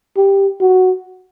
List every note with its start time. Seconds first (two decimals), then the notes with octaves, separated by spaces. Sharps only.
0.17 G4
0.61 F#4